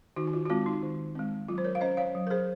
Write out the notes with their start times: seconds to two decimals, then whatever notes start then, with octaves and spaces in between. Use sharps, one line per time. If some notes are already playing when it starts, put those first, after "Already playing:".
0.16 D#3 D#4 F#4
0.27 F#4
0.33 F4
0.45 F#4
0.50 G#3 C4 F4
0.66 D#4
0.83 D#3
1.15 G#3 C4
1.48 F#3 F4
1.58 C5
1.64 A#4 C#5
1.75 F5
1.81 C#4 C5 D#5
1.97 C#5 F5
2.15 F#3
2.27 A#4
2.30 G#4 C5